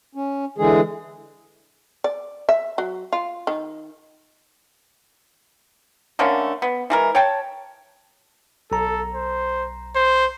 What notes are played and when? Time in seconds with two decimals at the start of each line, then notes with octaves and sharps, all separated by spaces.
0.15 C#4
0.58 D3 E3 G#3 G#4
2.04 D5
2.49 E5
2.78 F#3
3.13 F4
3.47 D#3
6.19 D3 A3 A#3 C#4
6.62 B3
6.90 E3 G#3 A#4
7.15 C#5 G5 A5
8.72 B1 A4 A#5
9.14 C5
9.96 C5